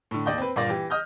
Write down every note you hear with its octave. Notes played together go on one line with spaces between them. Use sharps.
A2 D3
D#2 D5 D#5 G6
C4 B4
G1 A#2 A#3 D5 D6 A#6
E3 G4
D#5 D#6 F6 G6